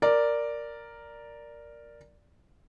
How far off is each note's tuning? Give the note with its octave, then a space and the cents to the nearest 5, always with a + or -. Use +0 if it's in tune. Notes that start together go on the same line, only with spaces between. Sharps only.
A#4 +0 D5 +0